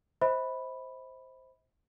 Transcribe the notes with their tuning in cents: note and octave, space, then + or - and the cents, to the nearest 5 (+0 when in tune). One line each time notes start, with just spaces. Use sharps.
C5 +0 E5 -45 B5 +0